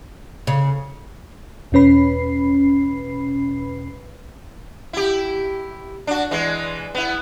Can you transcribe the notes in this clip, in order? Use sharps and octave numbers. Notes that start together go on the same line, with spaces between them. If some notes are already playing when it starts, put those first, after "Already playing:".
C#3
E2 B2 C#4 B4 B5 C7
E4 G4
D4 F#4
E3 G#3
B3 E4